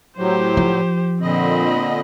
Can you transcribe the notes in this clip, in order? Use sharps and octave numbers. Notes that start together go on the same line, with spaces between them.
A2 F#3 G4 C5
F3
A#2 D3 C4 D#5 B5